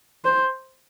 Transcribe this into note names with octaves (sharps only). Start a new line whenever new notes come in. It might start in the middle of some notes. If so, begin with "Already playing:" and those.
C5